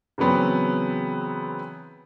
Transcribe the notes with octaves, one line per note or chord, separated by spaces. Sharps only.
C#3 E3 F#3 B3 C4